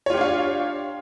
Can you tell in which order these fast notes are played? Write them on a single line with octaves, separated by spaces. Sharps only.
C#5 F4 G4 D4 F5